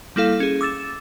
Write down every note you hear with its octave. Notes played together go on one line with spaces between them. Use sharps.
G3 A#3 E4 A4 F5
C#4 G#4
D6 E6 A6 E7